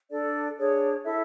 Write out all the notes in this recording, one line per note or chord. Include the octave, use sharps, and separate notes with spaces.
D4 A4 D5
D4 G#4 C#5
E4 A4 E5